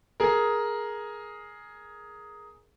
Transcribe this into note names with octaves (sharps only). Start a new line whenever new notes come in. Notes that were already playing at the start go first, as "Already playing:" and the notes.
G#4 A#4